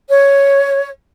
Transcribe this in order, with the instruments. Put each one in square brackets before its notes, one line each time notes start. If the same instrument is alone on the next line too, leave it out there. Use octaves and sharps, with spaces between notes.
[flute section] C#5